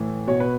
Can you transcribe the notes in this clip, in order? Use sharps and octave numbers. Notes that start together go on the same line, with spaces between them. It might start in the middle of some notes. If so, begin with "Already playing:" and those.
Already playing: A2 E3
B2 C#5
B4